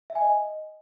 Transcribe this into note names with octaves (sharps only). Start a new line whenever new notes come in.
E5
G#5
D#5